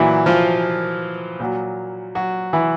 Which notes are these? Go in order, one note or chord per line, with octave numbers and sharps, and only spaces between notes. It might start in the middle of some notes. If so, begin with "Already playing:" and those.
Already playing: A#2 E3 F#3 E4
F3 F4
A#2 F#3
F#3 F#4
E3 E4